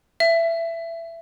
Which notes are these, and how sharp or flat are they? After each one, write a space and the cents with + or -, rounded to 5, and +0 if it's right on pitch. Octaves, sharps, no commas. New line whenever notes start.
E5 +20